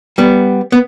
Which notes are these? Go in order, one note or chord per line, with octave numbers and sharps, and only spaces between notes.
G3 B3
B3